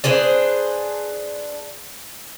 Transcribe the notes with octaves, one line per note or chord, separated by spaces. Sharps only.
D4 G#4 B4 C5